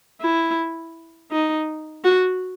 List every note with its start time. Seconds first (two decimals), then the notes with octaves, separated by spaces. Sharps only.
0.21 E4
1.31 D#4
2.04 F#4